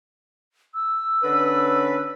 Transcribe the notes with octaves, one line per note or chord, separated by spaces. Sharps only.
E6
D3 C#4 B4